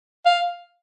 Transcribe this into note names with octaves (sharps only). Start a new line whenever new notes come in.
F5